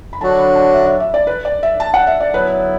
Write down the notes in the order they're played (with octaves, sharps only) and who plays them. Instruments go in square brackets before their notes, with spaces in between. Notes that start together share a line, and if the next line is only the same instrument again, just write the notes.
[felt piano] B5
[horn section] D3 F#3 D4 F#4 [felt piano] A5
[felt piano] B5
A5
E5
E5
E5
D5
B4
D5
E5
A5
F#5
E5
D5
[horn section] D3 F#3 B3 E4 [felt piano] B4